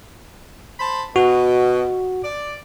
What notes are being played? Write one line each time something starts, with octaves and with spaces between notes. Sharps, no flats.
C5 A5 B5
B2 F#4
D5